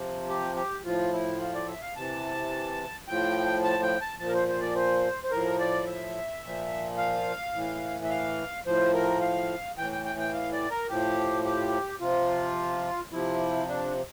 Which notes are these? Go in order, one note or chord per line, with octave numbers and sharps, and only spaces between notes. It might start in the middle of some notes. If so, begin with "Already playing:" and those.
Already playing: C3 F3
G4
G4
A2 F3 F4
E4
F4
D5
E5
F5
C3 E3 A5
A2 F3 G5
A5
G5
A5
A#2 F3 A5
A#4
C5
C5
D5
C5
C5
A2 F3 A#4
D5
E5
A#2 F3
F5
A2 E3
E5
F5
A2 F3 C5
A#4
F5
A2 E3 G5
G5
G5
G5
F5
D5
A#4
A2 F3 G4
G4
C3 F3 F4
C3 F3 E4
D4